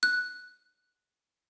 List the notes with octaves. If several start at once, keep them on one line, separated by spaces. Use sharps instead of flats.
F#6